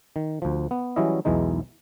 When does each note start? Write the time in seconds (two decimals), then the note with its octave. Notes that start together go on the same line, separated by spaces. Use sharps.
0.16 D#3
0.42 D2 F3
0.71 B3
0.96 E3 F#3 G3 C#4 E4 D#5
1.25 B1 E2 E3 G#3 D#4